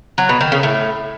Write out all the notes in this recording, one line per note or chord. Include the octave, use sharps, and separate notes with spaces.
F#3
B2
D#3
C#3
A2